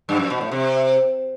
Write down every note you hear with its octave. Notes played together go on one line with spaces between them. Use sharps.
G2
F#2
B2
A2
C3